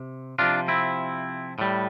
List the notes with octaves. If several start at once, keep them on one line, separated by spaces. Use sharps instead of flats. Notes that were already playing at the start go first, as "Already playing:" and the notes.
Already playing: C3
C3 F3 D4 F4
C4 E4
A2 G3